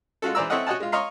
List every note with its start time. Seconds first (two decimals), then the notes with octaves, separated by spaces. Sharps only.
0.22 G#3 F4 F#4 A4
0.35 E3 G#4 C5 D5 A#5 E6
0.50 C4 E4 A4 C#5 D#5 F#5
0.67 F#4 C#5 D#5 F#5 G#5 A5
0.80 G#3 F4
0.92 C#5 D#5 F5 A#5 C6